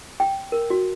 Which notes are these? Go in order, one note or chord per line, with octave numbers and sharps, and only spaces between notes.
G5
A#4
F#4